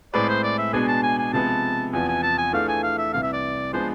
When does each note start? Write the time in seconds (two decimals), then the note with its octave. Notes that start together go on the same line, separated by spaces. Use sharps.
0.14 A2 G#3 C4 G#4 B4 D5
0.29 C5
0.43 D5
0.59 E5
0.73 B2 G#3 B3 D4 G#4 G#5
0.88 A5
1.03 G#5
1.18 G#5
1.33 C3 F3 G#3 B3 A5
1.93 E2 C3 F3 G#5
2.08 G#5
2.23 A5
2.38 G#5
2.53 E3 A3 D4 F4 G#4 F5
2.68 G#5
2.83 F5
2.98 E5
3.13 C2 C3 E3 F5
3.23 E5
3.33 D5
3.73 F3 G#3 B3 D4 C5